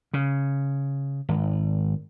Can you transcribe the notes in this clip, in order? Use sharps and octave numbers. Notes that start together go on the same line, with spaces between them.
C#3
G#1